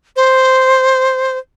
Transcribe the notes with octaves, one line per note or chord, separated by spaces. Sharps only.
C5